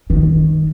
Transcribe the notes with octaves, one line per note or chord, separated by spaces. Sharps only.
D#3